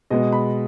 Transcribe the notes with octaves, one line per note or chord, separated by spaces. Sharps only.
B2 G#3 B3 D#5
B5